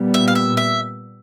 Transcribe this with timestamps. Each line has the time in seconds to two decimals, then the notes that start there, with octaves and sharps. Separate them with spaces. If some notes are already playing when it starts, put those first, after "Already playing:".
Already playing: A#2 G3 B3
0.14 E5
0.28 F5
0.35 E5
0.57 E5